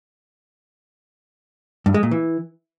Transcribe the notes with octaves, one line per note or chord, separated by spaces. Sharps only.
G2
G#3
A#2
E3